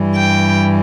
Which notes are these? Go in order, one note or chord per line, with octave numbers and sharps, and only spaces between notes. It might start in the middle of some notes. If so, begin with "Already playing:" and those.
Already playing: G2 E3 G3
G5